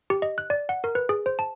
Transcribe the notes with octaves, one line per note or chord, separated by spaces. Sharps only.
G4
D#5
F#6
D5
F#5
A#4
B4
G#4
C5
A5